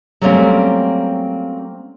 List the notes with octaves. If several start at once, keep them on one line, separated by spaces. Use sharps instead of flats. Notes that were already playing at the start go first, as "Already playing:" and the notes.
F#3 G3 A3 A#3 C4 C#4